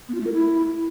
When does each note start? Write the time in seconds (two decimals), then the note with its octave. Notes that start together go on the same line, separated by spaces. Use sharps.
0.09 B3
0.15 F4
0.21 A3
0.27 A#4
0.33 E4